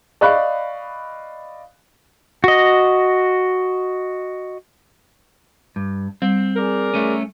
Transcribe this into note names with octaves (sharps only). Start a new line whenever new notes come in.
D5 D#5 F5 B5 C#6 F#6
F#4 D#5
G2
G3 C4
G#4 A#4 D5
A3 C#4